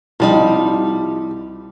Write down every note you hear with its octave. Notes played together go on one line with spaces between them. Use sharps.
C2 F3 G3 D#4